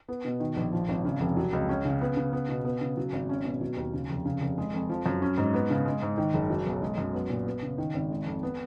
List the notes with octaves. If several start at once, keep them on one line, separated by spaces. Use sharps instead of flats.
B3
B2
D#3
A#1
F3
G#1
C#3
F1
F#3
C#2
C#4
C#3
B3
C#3
B3
B2
B3
C#3
F#3
G#1
C#4
B2
F#3
D#2
C#3
F1
C#3
F1
G#3
F2
F3
F#2
C#4
G#2
B3
C#3
G#3
G#2
D#3
F#1
F#3
B1
G#3
F#2
B3
A#2
B3
C#3
D#3
G#1
G#3
F2
B3